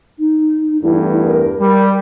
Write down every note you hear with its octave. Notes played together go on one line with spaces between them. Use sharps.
D#4
E2 G2 A3 E4
A#4
G3 A#4